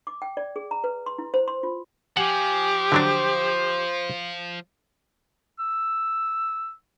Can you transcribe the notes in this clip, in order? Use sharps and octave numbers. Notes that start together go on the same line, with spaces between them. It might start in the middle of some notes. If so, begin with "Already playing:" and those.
D6
G5
D5
G#4
A#5
B4
C6
E4
C5
C6
F4
F3 G4 F#5 G#5
D3 F#3 D4 C5
E6